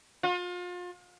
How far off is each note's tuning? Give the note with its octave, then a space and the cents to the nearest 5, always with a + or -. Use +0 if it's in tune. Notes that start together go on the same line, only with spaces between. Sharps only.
F4 +35